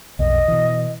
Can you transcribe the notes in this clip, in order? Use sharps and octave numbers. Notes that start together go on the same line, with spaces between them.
B1 F2 D#5
B2 E3